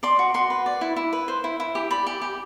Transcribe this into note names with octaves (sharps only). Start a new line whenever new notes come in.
D5 C6
F#4
F#4 C6
B4
D5
E4
E4
B4
C5
E4
E4
G4
D5 B5
G4
G4